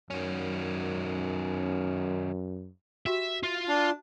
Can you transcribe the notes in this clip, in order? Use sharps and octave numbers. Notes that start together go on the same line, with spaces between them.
F#2 D#3 C#4
F#4 G4 E5 G5
F4 E5
D4